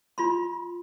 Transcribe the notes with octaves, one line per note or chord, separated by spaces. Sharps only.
F4 B5 C6